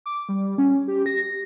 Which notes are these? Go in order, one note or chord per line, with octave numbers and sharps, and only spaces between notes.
D6
G3
C#4
G4
A#6